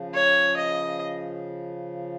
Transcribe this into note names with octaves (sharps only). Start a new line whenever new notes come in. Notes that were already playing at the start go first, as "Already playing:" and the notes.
Already playing: C#3 F3
C#5
D#5